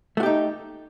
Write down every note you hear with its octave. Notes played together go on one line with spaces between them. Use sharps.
A3 D#4 F#4 G4